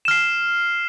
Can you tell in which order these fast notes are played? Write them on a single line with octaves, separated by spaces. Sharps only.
E7 F6 C7